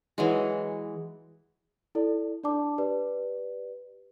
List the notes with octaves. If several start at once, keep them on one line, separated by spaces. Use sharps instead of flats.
E3 F#3 G#3
E4 A4 D5
D4 D5 A5 D6
G4 B4 D5